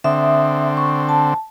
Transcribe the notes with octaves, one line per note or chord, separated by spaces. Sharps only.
D3 C4 E5 D#6
C#6
A5